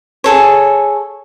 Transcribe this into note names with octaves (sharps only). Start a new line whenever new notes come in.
G#4 A4 C#5